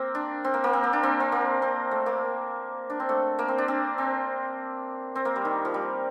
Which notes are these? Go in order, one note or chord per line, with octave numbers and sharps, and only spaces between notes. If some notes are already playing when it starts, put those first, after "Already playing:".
Already playing: A#3 C4
D4
C4
A#3
A#3
C4
A#3
D4
C4
C4
A#3
C4
A3
A#3
D4
C4
A3
A#3
C4
D4
C4
C4
C4
A#3
G3
D#3
F3
G3